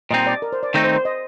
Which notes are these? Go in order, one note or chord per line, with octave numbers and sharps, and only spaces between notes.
A#2 G3 C4 D#4 D#5
D5
A#4
C5
D5
D#3 A3 C4 D#4
C5
C5
D#5